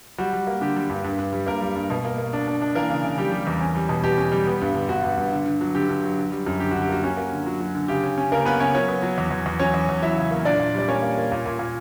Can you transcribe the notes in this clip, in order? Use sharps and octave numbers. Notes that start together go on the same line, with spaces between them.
G3 F#4
G3
A#3
D3 G4
G3
G2
G2
G2
G3
G2 A#3 A#4
G3
G2
B2
A#3
A#3
D4
D4
D4
E3 A#3 A#4
C#3
C#3
G3 G4
G3
E2
C#4
G3
B2
B2 G4
C#4
G3
B3
G2
D3
G2 F#4
G2
G2
D3
D3
F#3
D3 G4
D3
F#3
D3
G3
F#2
D3 G4
F#4
D3
G4
A#3 F#4
C#4 F#4
A#3
D3
F#3
F#3
D3
C#3 G4
C#4
C#4
C#3 A#3 A#4
B3 C#4 B4
C#3 C#4 C#5
F#3 C#4 C#5
B3
F#3
E2
E2
E2
F#3 C#4 C#5
E2
E2
F#3 E4 E5
C#3
A#3
A#2 D4 D5
A#2
G3 D5
A#3 C#4 C#5
A#3
A#3
A#2
A#2
A#2